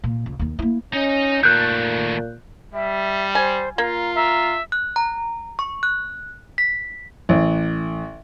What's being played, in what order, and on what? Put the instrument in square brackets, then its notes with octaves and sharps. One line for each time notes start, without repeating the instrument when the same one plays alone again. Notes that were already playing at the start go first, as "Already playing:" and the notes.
[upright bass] A#2
C#2
D#2 D#3
A#3 E4
[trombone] C#4 [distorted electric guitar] D#4 D#5
[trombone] A#2 [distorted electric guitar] D#3 A3 [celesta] F#6 G6
[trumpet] G3 [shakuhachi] E5
[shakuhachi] C5 [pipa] G#5
[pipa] A#3 [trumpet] F4 [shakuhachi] A#5
[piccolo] E5 [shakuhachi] A#5
[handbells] F#6
A#5
C#6
F#6
B6
[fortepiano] A1